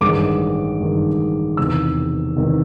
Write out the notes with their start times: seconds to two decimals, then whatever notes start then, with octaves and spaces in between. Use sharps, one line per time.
0.01 A1 G2 D#3 G#3 D6
0.80 A1 G2 D#3 G#3
1.57 E1 E2 C3 D#3 E6
2.36 E1 E2 C3 D#3